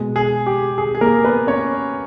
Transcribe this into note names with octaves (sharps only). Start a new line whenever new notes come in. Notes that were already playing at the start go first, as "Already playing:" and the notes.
Already playing: B2 G#3
G#4
G4
G#4
G#4
A#3 A#4
B3 B4
C#4 C#5